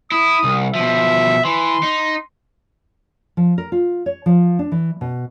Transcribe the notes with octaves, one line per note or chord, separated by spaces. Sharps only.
E4 D#6
C2
B2 F3 E5
E3 C6
D#4
F3
A#4
F4
C#5
F3
D4
E3
B2